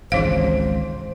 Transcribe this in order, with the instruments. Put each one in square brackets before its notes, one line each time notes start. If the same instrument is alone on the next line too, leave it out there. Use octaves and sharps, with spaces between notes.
[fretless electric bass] G#1 C#2 G#2 [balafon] E3 F5 [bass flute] C5